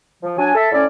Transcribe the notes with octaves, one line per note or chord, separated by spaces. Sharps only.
F3
F#3 D4 G#5
A4 E5
A2 C#4 D5